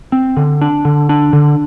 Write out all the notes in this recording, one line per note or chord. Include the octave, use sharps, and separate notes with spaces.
C4
D3
D4
D3
D4
D3